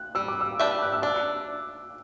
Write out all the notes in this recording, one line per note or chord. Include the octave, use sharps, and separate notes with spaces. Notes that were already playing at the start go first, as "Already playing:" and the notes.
Already playing: F#6
G3 E6
D6
E6
D4 G4 B4 E5
F#6
E6
D4 D6